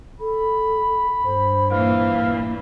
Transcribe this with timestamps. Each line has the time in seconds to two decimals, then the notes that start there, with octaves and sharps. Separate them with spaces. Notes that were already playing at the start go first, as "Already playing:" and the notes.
0.20 A4 B5
1.25 G2 C5
1.71 A#2 E3 F5